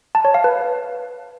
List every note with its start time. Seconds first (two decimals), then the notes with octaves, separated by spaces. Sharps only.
0.15 A5
0.25 C#5
0.34 F5
0.44 B4